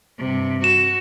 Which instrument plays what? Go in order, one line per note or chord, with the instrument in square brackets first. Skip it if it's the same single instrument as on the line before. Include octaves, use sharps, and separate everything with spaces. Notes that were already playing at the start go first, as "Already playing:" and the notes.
[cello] G2 C3
[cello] F#4 [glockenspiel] E7